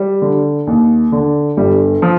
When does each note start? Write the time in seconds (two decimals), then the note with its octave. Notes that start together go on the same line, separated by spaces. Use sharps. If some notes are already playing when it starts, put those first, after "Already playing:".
Already playing: G3
0.22 D3
0.67 D#2
1.12 D3
1.57 G1 G3
2.02 F3